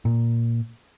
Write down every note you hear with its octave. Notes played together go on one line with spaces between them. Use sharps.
A#2